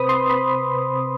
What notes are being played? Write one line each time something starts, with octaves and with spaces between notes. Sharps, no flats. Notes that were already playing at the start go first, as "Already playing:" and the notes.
Already playing: C3 C4 B4 C5 B5 D#6
C6
B5